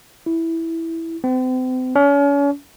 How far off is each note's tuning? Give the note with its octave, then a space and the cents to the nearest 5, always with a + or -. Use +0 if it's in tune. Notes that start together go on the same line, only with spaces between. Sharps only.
E4 -5
C4 -40
C#4 +40